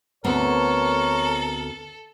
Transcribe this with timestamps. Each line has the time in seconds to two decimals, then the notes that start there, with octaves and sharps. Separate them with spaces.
0.24 D2 B3 C4 A4 A#4 C#5